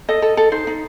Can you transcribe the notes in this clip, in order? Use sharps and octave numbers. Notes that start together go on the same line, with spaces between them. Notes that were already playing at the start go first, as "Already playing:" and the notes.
A4 D#5
A4
A4
D#4 C5
D#4